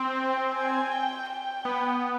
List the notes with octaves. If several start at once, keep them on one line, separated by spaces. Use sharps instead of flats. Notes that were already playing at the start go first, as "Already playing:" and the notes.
Already playing: C4 G5
G#5
G5
G5
B3